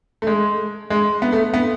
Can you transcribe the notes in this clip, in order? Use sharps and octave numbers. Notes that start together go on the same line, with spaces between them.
A3
G#3
G#3
B3
A3
B3